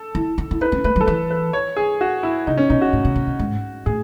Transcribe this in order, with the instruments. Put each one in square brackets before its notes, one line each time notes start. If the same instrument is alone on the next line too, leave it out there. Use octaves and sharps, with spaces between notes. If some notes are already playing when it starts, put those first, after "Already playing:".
Already playing: [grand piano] A4
[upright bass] E4
D#4
E4
[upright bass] D#4 [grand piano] B4
[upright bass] C#4
[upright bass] A3 [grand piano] B4
[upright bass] F#3
[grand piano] A4
[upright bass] E3 [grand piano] B4
[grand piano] B4
C#5
G#4
F#4
E4
[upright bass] C#3 [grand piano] D#4
[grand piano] C#4
[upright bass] B2 [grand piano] D#4
[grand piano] F#4
[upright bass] A2
B2
B2
B2
G#2
[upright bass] A2 [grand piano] G#4